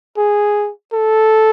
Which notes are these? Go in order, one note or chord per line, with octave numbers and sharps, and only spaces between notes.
G#4
A4